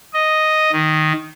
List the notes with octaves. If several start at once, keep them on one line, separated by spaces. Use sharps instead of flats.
D#5
D#3